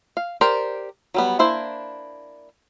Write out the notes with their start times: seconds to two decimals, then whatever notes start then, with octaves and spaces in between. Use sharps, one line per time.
0.17 F5
0.41 G4 A#4 C5 D5
1.14 F#3 G3 B3
1.39 A#3 D4 E4 C5